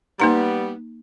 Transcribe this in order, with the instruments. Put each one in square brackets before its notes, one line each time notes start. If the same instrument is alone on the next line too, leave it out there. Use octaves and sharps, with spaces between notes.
[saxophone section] G3 B3 [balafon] A#3 D#4 A#5